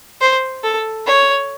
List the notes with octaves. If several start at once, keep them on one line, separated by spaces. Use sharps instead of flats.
C5
A4
C#5